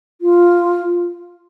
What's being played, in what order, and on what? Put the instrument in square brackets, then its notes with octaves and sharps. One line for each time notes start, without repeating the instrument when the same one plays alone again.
[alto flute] F4